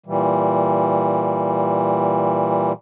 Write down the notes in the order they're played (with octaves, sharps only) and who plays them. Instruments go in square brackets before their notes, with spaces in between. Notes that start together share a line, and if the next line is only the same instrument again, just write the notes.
[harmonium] A#2 E3 G3